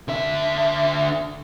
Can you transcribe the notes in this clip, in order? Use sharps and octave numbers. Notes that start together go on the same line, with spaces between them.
D3 E5